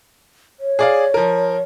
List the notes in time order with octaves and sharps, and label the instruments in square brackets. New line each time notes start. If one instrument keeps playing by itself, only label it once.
[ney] C#5
[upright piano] G#4 D5 F5
F3 A#4